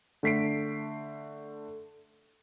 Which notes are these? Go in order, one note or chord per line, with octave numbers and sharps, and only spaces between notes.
D3 A3 B6 C7 D7